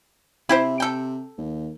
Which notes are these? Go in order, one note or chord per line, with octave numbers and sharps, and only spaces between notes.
C3 E4 G4 C5
A4 G5
D#2